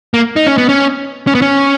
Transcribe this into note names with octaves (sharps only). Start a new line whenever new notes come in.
A#3
D#4
C#4
B3
C#4
C#4
B3
C#4